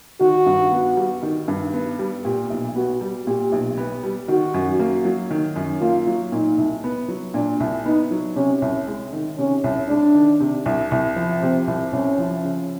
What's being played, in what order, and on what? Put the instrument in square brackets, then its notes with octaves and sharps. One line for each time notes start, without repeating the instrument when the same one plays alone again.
[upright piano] D#3 [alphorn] F#4
[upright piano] G2
B3
G3
D#3
G2
B3
G3
[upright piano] A#2 [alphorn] G4
[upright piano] B1
[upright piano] B3 [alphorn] F#4
[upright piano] G3
[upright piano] A#2 [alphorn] G4
[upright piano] B1
B3
G3
[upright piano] D#3 [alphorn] F#4
[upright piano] F#2
A#3
F#3
D#3
F#2
[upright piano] A#3 [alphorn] F4
[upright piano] F#3
[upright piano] A#2 [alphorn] D#4
[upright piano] C2
B3
F#3
[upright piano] A#2 [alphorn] D4
[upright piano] C2
[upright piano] B3 [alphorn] D#4
[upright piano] F#3
[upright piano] C3 [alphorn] C#4
[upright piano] C2
G#3
D#3
[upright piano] C3 [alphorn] C#4
[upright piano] C2
[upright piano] G#3 [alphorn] D4
[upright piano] D#3
C3
C2
C2
F3
[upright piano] C3 [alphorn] C4
[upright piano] C2
[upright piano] C2 [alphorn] C#4
[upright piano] F3
C#3